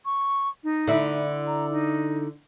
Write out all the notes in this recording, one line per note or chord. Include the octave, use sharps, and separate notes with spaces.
C#6
D#4
D3 E4
A#5
D#4